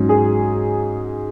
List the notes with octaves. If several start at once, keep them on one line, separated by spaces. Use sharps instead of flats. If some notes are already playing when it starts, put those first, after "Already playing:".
Already playing: G#2 F#3 C#4
G#4